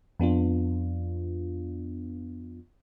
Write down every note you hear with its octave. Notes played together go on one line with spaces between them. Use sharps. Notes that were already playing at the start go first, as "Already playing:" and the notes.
F2 B3 D4 F4